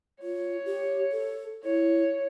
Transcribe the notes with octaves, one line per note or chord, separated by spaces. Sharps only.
F4 C#5
G4
A4
E4 C#5